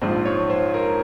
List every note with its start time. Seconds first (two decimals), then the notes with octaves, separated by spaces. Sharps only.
0.01 A#1 G#2 F3 C5
0.25 C#5
0.50 C5
0.74 A#4